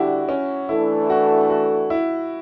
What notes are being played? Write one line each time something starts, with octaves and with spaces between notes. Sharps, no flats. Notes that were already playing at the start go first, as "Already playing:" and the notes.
Already playing: D3 G3 D4 E4 F#4 G4
C#4
E3 A3 D4 E4 A4
F#4
F#4
E4